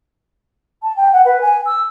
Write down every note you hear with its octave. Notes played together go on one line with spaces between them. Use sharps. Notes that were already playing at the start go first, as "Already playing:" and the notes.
A5
G5
F#5
B4
G#5
E6